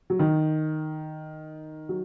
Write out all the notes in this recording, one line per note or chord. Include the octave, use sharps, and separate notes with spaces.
F#3
D#3
F#3